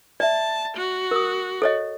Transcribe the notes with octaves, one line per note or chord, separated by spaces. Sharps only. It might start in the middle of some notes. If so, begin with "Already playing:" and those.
D5 E5 A5
F#4
A#4 D#6
A4 C#5 D#5